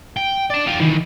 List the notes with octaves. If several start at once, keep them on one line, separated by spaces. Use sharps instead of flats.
G5
D5 A5
F4 G4
D#3 E3